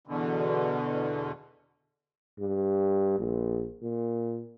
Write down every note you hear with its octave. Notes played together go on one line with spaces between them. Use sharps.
E2 B2 D3
G2
A#1
A#2